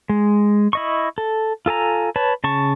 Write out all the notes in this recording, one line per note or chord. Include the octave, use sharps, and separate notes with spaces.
G#3
E4 D#5 C#6
A4
F4 A4 G#5 A#5
B4 C#5 A5
C#3 A5 C#6